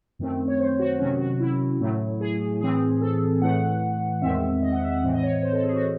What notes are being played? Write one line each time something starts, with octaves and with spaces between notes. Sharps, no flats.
F#2 D#3 A3 C4
C#5
C5
F#4
C3 D#3 F#3 C#4 F#4
F#4
E4
A2 F#3 A3
G#4
A2 E3 C4 G#4
A4
A2 E3 A3 F#5
E2 D#3 G#3 C4 E5
D#5
F#5
E5
F#5
A2 E3 C4
D#5
C#5
C#5
C5
A4
G#4
F#4